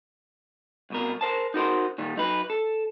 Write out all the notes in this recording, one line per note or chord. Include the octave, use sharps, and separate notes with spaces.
C2 B2 A#4
A#4 C5 A5
D#4 F#4 A#4 C5
A#2 D#3 G3
F#3 D#4 B4
A4